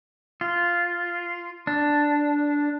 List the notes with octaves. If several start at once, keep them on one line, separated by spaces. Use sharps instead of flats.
F4
D4